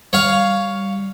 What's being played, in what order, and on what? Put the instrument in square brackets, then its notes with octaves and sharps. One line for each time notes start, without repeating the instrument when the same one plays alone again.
[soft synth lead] G3 [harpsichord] C#5 F5